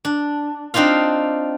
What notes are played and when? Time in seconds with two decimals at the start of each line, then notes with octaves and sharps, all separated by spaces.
0.05 D4
0.74 C4 D4 D#4 F4 F5